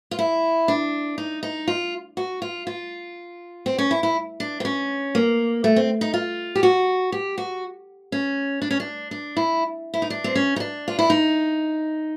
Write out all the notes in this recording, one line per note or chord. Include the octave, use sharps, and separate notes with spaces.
F4
E4
D4
D#4
D#4
F4
F#4
F4
F4
C4
C#4
E4
E4
D4
C4
C#4
A#3
A3
C4
D#4
F4
G4
F#4
G4
F#4
C#4
D4
C#4
D4
D4
E4
E4
D#4
D4
C4
C#4
D#4
D4
F4
E4
D#4